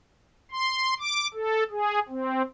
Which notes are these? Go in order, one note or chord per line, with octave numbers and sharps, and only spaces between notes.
C6
D6
A4
G#4
C4